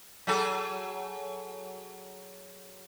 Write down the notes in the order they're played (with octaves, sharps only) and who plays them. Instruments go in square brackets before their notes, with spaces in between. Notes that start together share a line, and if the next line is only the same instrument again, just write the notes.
[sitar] F#3 G#4 A4